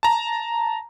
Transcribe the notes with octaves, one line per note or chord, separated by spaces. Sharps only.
A5 A#5